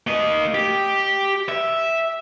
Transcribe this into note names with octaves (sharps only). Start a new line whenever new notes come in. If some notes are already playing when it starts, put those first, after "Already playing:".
A#3 D#5
G4
E5